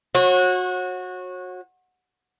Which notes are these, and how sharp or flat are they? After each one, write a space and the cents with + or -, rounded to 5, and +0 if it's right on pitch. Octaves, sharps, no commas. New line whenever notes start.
F#4 -20 C#5 -35